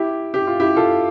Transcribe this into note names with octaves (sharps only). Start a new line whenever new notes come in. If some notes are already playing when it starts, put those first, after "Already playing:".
Already playing: E4 G4
G4
F4
E4 G4
F4 A4